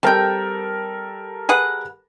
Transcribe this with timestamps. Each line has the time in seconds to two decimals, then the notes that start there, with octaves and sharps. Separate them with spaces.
0.03 G3 C4 A4 A#4 G5
1.49 G#4 B4 F#5